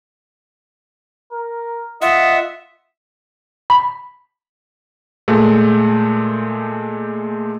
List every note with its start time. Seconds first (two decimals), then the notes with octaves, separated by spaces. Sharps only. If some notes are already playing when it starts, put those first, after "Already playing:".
1.32 A#4
2.02 F4 D#5 E5 F#5
3.70 B5
5.28 A#2 G#3 A3